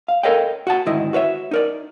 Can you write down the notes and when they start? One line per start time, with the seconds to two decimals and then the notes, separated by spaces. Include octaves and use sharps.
0.08 F5
0.23 A4 A#4 C#5 D#5 F5 G5
0.67 F#4 F#5 A5
0.86 D2 G#2 D#3 E4 D#5
1.13 F#4 B4 C#5 E5
1.51 D#4 A#4 D5